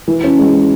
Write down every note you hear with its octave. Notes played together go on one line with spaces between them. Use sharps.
E3
C#4
G#3